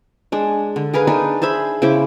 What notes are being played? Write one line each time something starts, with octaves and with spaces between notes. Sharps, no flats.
G#3 D4
D3
G#4 A#4 B4 F5
D4 D#4 G#4 B4
G#4 C5 E5 B5
C#3 E4 C5 D6